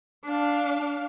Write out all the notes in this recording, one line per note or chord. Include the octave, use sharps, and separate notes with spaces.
D4 F5